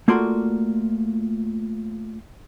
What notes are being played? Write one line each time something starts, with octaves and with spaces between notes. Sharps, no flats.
A3 A#3 F4 F#4 D5 C6